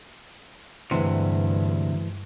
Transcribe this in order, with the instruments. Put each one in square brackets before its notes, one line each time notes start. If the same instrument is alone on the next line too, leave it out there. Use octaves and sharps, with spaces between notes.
[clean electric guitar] D2 C3 [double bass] G2 [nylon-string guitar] E3 G#3 C5